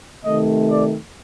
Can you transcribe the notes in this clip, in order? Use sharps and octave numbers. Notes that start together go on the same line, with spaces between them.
C3 D#3 A3 D#5
D5